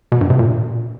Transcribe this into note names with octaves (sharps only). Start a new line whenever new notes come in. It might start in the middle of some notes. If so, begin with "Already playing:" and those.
B2
G2
C3
A#2